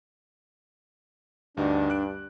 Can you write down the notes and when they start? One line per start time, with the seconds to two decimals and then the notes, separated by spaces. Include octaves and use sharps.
1.57 D2 G2 D4 D#4 F#4
1.90 F#6 D7